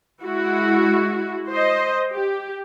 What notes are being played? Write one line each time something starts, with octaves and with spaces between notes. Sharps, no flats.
G#3 E4 F#4
C5 D#5
G4